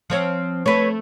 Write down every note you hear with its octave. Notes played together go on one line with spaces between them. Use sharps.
F3 C4 C#5
A3 B4 C#5